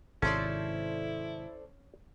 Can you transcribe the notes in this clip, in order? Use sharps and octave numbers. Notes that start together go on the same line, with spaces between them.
G#1 C3 C#4 E4 A4 C5 D5